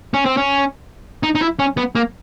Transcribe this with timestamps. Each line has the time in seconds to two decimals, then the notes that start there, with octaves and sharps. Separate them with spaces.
0.14 C#4
0.26 C4
0.37 C#4
1.23 D#4
1.35 D#4
1.41 E4
1.59 C#4
1.77 B3
1.95 A#3